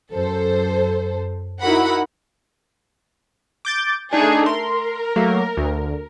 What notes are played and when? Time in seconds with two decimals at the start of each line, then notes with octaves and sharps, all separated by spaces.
0.12 F#2 A4 C5
1.63 D#4 E4 F#4 A#4 F#5 B5
3.65 D6 G6 A6
4.13 A3 D4 D#4 G#4
4.46 A#4 C6
5.16 F#3 A3 A#3
5.57 D2